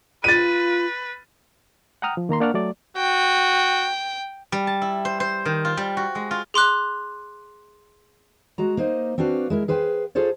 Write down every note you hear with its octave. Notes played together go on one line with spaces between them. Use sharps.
F4 B4 A6 D#7
F#5 G5 A#5 D#6 F6
F3
D#3 A#3 A#5 C6
A#3 D4 D5 F#5 C#6 F6
F#3 A3 D5
F#4 G5
G3
A5
E4
C5
C5
D#3
F4
G3
F#4
G#3
F4
G#4 C6 D6 F#6
G#3 F#4 A#5
A#3 D#4 C5 D#5
C4 D4 F#4 B4 F5
G#3 E4 A#4
G#4 B4 C5 F5 G5
F4 G#4 A4 C5 C#5